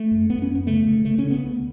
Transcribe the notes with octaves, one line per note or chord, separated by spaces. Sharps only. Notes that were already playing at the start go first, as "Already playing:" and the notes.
Already playing: A3
F#2
F#2 B3
C#4
F#2
B3
C#3 A3
C#3
C#3 A3
C#4
C#3
B3
D2